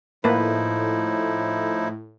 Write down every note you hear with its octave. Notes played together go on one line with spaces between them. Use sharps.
A2 F3 A#3 D#4 E4 B4